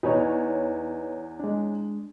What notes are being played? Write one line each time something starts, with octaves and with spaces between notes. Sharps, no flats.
E2 D#4 B4 C#5
G#3 D4